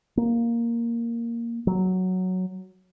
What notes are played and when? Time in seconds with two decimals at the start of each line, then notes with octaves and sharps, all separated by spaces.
0.17 A#3
1.67 F#3